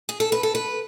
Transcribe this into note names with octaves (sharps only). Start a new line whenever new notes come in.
G#4
A4
B4
A4
B4